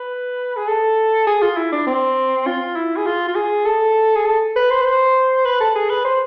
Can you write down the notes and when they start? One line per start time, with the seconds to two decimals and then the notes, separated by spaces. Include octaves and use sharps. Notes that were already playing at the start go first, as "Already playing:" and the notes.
Already playing: B4
0.56 G#4
0.67 A4
1.27 G#4
1.42 F4
1.57 E4
1.72 D4
1.87 C4
2.47 F4
2.76 E4
2.97 G#4
3.06 F4
3.28 F4
3.36 G#4
3.65 A4
4.15 G#4
4.25 A4
4.56 B4
4.70 C5
4.81 B4
4.85 C5
5.45 B4
5.61 A4
5.75 G#4
5.89 B4
6.05 C5